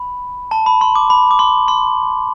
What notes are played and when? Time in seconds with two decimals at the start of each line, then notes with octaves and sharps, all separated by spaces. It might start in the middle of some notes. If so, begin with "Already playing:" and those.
Already playing: B5
0.51 A5
0.66 B5
0.81 C6
0.95 D6
1.10 B5
1.31 D6
1.39 C6
1.68 C6